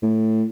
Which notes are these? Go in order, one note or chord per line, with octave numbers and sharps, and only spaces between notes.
A2